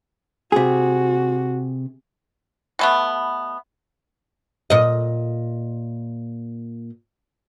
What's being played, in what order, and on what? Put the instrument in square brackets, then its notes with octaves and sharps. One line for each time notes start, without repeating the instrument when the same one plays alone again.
[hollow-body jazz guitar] C3 G#4 [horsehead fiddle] F#4
[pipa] B2 A3 B3
[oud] A#2 D#5